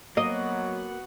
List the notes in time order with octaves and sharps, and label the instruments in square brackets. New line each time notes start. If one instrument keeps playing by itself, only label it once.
[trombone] F#3 [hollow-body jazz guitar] A#3 [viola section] B3 F#4 F#5 [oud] D#5